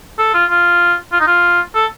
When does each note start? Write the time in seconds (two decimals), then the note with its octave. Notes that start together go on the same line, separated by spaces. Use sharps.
0.18 A4
0.34 F4
0.50 F4
1.12 F4
1.20 D#4
1.27 F4
1.75 A4